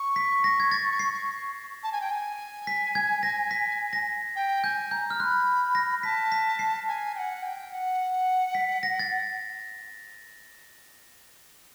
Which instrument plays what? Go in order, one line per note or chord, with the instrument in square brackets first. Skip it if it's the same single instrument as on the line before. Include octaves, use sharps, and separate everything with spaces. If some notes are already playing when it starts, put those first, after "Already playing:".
Already playing: [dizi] C#6
[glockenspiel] B6
A#6
G#6
A6
C7
[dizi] A5
G#5
G5
G#5
[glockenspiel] B6
G#6
A#6
B6
A#6
[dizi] G5
[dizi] G#5 [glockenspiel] G6
[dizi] A#5 [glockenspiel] G6
[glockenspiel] F6
[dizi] B5 C6 [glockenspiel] F#6
[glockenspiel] A#6
[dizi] A5 [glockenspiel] B6
[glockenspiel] B6
C7
[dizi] G#5
G5
F#5
G#5
G5
F#5
[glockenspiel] B6
A#6
A6